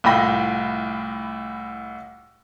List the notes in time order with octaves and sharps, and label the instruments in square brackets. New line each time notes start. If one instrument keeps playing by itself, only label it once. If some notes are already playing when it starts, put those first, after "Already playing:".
[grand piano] C2 A2 F4 G5 B5 A#6